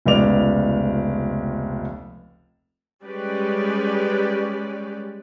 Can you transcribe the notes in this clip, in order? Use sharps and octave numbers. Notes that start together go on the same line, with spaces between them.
F1 C#2 B3 D5 F7
G3 G#3 C#4 G4 B4 D5